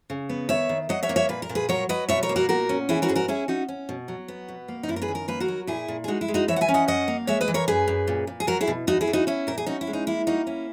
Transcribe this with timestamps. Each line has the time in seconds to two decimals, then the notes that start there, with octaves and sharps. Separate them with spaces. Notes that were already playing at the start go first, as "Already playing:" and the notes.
0.10 C#3
0.29 B3
0.49 D#3 C#5 E5
0.69 D#3
0.89 F#3 D#5 F#5
1.03 C#5 E5
1.09 A#3
1.16 C#5 E5
1.29 A#2 B4
1.42 A#4
1.49 A#2
1.55 G#4 B4
1.69 F#3 A#4 C#5
1.89 F#3 B4 D#5
2.09 B2 C#5 E5
2.23 A#4 C#5
2.29 A#3
2.36 F#4 A#4
2.49 A#2 F#4 A#4
2.69 C#4
2.89 E3 E4 G#4
3.02 F#4 A#4
3.08 G#2 G#4
3.16 F#4 A#4
3.28 C#4 E4 G#4
3.48 C#4 D#4 F#4
3.69 C#4
3.89 B2
4.08 F#3
4.28 B3
4.48 B2
4.68 A#3
4.83 D#4
4.88 F#2 E4
4.96 A#4
5.02 G#4 B4
5.08 D#3
5.15 A#4
5.28 A#3 B4
5.40 F#4 A#4
5.48 F#3
5.67 A#2 E4 G#4
5.88 A#2
6.04 G#4
6.08 G#3 D#4 F#4
6.21 E4
6.28 G#3
6.34 D#4 F#4
6.48 E3 C#5 E5
6.56 F#5
6.61 E5 G#5
6.68 C#4
6.74 D#5 F#5
6.88 F#2 D#5 F#5
7.08 A#3
7.27 G#3 C#5 E5
7.41 B4 D#5
7.48 E3
7.54 A#4 C#5
7.68 F#2 G#4 B4
7.88 F#2
8.08 A#2
8.27 A#2
8.40 G#4
8.47 F#3 F#4 A#4
8.61 E4 G#4
8.67 B2
8.87 E2 D#4 F#4
9.01 E4 G#4
9.07 E2
9.13 D#4 F#4
9.27 C#4 E4
9.47 A#2 A#4
9.58 G#4
9.66 C#4 D#4 F#4
9.81 E4
9.87 G#3
9.93 D#4
10.07 A#3 E4
10.27 A#3 D#4 F#4
10.47 C#4 E4